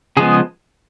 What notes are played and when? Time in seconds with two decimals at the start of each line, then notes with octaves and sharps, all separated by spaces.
0.17 C#3 F3 G#3 B3 G#4